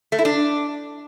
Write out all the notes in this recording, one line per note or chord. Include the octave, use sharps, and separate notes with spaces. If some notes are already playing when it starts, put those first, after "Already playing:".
A3
E4
D4